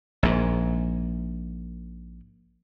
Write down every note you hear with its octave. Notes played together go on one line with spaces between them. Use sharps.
A#1 G#2